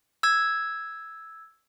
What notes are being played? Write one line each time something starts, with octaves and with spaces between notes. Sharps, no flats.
E6 G#6